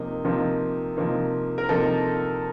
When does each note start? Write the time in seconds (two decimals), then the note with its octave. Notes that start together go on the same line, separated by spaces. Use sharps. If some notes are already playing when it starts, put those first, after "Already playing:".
Already playing: C3 F3 A#3 D#4
0.24 C3 F3 A#3 D#4
0.97 C3 F3 A#3 D#4
1.58 A#4
1.69 C3 F3 A#3 D#4 A4